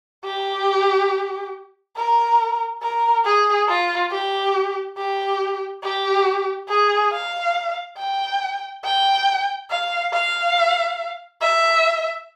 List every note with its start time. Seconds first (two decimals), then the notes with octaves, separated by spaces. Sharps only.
0.25 G4
1.96 A#4
2.82 A#4
3.25 G#4
3.69 F4
4.11 G4
4.97 G4
5.83 G4
6.69 G#4
7.12 F5
7.98 G5
8.84 G5
9.71 F5
10.13 F5
11.42 E5